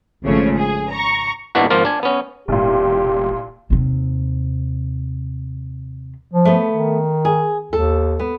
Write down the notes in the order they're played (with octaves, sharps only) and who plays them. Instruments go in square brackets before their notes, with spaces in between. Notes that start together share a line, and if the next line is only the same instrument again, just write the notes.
[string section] G#1 C#3 F3 A3 C#5
G#4
A#5 C#6
[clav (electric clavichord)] G#1 D#2 B2 E3 D4 F#4
G#1 F3 A#3 F4
D4 G#5
B3 C#4
[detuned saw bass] E1 [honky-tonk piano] C2 A#2 [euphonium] G4
[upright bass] D#2 C3
[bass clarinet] F3
[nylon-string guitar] A3 B3
[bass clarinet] D#3
[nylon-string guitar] G#4
[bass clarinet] D#2 [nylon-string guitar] A4
[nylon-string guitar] B3